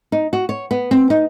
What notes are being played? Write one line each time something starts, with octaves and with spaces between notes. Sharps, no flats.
D#4
F#4
C#5
B3
C4
D#4